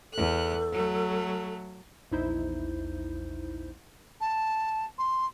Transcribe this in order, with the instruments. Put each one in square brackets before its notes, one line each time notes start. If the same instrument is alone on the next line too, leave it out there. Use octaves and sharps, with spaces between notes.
[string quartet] E2 F#6 [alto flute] A4
[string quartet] F#3 A3
[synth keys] A#1 E2 D#4 E4 C5 G6
[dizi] A5
C6